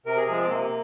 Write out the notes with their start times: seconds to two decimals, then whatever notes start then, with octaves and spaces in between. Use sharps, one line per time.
0.06 C3 A#4
0.17 G#4
0.28 F3 G#3 G#4
0.39 C4
0.49 C3 A#3